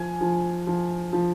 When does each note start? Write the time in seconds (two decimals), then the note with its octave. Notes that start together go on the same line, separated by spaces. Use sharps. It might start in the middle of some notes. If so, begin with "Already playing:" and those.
Already playing: F3 G#5
0.21 F3
0.67 F3
1.13 F3